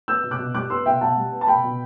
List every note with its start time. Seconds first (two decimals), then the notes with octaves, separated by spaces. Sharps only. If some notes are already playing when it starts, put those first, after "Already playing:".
0.08 B3 E6 G6
0.23 B2
0.31 D6 F#6
0.39 B2
0.54 G3 D6 F#6
0.70 B3 C6 E6
0.86 B2 E5 G5
1.01 B2 F#5 A5
1.16 G3
1.32 B3
1.41 A5
1.47 B2 G5 B5
1.64 B2